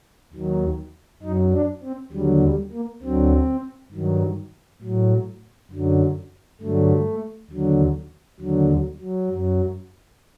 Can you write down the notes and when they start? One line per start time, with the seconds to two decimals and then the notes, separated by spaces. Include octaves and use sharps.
0.33 D#2 D#3 F#3
1.23 F#2 F#3 D#4
1.52 D4
1.83 C4
2.12 D#2 D3 F#3 G3
2.42 G3
2.72 A#3
3.02 D2 D3 F#3 C4
3.92 G2 D#3 F#3
4.82 A2 F#3
5.71 F#2 D3 F#3
6.61 G2 D3 F#3 A3
7.51 D#2 D3 F#3
8.40 D#2 D3 F#3
8.71 F#3
9.01 F#3
9.30 F#2 F#3